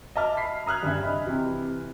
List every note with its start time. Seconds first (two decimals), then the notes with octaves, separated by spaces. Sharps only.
0.16 D#5 E5 A5 D6 F6
0.37 B5 B6 C7
0.66 A#5 D#6 F6 F#6 G#6
0.83 G2 C#3 C#4 E5
1.02 D#5 B5
1.26 C3 E3